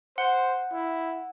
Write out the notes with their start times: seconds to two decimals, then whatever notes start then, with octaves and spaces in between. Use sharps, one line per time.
0.18 C5 F#5
0.72 E4